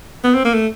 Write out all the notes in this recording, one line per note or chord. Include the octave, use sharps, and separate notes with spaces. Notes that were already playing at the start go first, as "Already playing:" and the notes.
B3
C4
A#3
A3